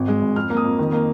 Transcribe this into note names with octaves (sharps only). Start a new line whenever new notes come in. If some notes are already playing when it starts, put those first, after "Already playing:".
Already playing: G#1
G#3
G#1
F2 F6
A#3
D#6
F2
D#3
A#3